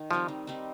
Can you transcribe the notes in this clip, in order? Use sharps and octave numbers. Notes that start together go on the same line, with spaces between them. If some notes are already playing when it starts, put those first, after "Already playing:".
Already playing: D#3
F3 G3 C4 D#4
D#3
G3 C4 D#4